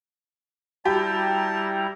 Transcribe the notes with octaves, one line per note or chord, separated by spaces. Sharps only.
G3 E4 F#4 G4 A5 A#5